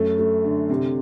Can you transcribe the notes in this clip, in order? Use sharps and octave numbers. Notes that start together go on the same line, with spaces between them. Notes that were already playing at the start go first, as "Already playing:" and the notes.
Already playing: F#2 A3
A3
D3
C3